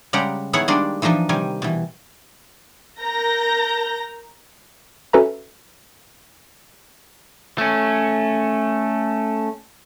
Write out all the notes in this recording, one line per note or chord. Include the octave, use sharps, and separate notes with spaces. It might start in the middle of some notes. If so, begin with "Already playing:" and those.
C#3 G3 G#3 G4 F#5 A#5
D#3 B3 E4 G#4 C#5 F#5
D#3 G3 G#3 A#3 D4 D5
E3 F3 D4 D#4 D#5
C3 D#3 G3 G#5
B2 E3
A#4 A#5 G6 A#6
C#4 F#4 A4 B4 E5 A#5
A3 C#4